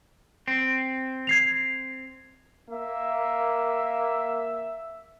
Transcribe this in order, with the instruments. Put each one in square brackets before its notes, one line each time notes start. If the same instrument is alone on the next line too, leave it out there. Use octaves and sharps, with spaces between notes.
[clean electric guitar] C4
[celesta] G#6 C7 F7
[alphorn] A#3 [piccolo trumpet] E5